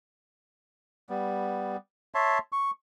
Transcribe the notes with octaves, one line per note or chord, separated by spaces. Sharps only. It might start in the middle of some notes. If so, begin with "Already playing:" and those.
G3 B3
C#5 E5 A5 C6
C#6